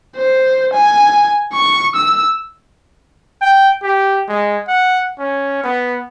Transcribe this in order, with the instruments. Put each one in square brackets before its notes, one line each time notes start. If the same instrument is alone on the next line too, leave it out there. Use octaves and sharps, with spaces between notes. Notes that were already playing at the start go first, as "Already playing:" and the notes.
[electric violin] C5
G#5
C#6
E6
[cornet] G5
G4
G#3
F#5
C#4
B3